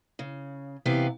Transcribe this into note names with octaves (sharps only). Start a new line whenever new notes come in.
C#3
C3 E3 B3 G4 F5